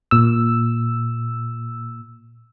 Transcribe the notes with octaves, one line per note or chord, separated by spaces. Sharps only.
A#2 E6